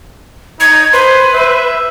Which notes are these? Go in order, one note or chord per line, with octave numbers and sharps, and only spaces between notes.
D#4 G#6
B4 C5
E5